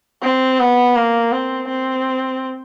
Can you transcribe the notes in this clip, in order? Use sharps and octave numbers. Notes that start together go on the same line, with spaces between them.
C4
B3
A#3
C4
C4